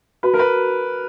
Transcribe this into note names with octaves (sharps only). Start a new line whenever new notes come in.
F#4 B4
A#4
B4